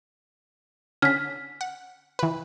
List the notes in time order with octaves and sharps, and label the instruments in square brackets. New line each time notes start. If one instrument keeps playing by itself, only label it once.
[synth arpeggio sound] D3 C#4 [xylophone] F6 B6
[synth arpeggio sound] F#5
E3 B4